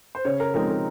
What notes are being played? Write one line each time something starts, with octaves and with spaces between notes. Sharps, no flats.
C5
C#3 C#5
A#4
F3 G#3 C4 D#4 A#4
A#4